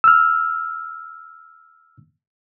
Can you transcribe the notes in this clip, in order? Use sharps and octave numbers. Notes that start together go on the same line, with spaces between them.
E6 F6